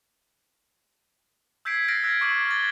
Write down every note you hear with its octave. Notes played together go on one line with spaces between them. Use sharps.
E6 G6 G#6 B6 C7 D7
F6 A6 A#6 C7 D7
E6 F#6 G#6
C#6 D6 F6 G#6 F#7
G#6 A6 G7